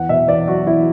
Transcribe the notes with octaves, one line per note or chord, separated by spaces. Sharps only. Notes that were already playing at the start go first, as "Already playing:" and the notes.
Already playing: E2 F#5
B2 E5
E2 D5
F#3 F#4
E2 E4